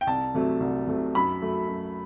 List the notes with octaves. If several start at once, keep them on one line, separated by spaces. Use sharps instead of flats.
G5
C2 A5
C3 F#3 A3
C2
C3 F#3 A3
F#2 B5
F#3 A3
F#2